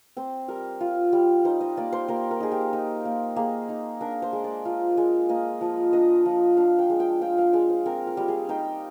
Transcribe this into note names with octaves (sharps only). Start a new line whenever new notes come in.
C4 C5
G3 A#4
F4
G3
D#4 C5
D#5
A#3 D5
C5
A#3 A#4
A#4
D#4 G#4
G4
D#4
A#3
A#3 G#4
D#4
D4 A#4
C5
G#3
D5
F4
G#3
A#3 D#5
F3
D4 D#5
F3
D4 F5
G5
G#3
G5
F4 G5
F5
G#3 D5
C5
C4 A#4
A#4
G3
G#4
D#4 G5